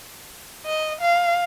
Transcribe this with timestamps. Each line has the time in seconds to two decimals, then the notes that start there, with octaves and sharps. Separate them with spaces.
0.66 D#5
1.01 F5